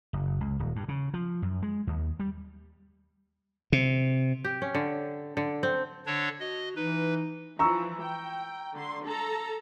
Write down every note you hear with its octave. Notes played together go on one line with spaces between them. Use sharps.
F#1
C#2
D#1
G2
C#3
F3
F#2
G#3
D#2
G3
C3
G4
C#4
D3
D3
C4
D3 D4 C#5
F#4 D#5
E3 D#4 B4
E3 F3 A#5 C#6 E6
G5
D3 C6
A4 A#5